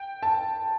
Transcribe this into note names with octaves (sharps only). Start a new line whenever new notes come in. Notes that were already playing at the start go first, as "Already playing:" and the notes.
Already playing: G5
A5